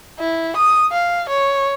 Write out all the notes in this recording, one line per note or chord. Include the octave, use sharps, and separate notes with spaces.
E4
D#6
F5
C#5